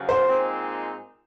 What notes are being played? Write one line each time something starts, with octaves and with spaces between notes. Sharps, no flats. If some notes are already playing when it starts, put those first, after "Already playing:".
Already playing: F#2 C#3 F3 F#4
C5
A#2 G#3 C4 D#4